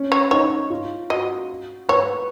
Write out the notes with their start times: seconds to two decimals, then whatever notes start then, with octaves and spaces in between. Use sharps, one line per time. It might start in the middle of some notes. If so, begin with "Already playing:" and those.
Already playing: C#4
0.12 C#5
0.31 D#4 C#5
0.70 F4
1.10 F#4 D#5
1.89 B4 C#5